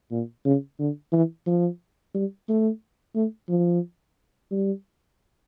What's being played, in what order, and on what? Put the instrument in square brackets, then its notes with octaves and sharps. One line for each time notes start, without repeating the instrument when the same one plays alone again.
[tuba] A#2
C#3
D3
E3
F3
G3
A3
A3
F3
G3